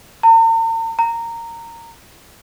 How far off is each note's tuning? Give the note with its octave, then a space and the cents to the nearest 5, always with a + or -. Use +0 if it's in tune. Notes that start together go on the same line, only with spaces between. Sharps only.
A#5 -45
A#5 -15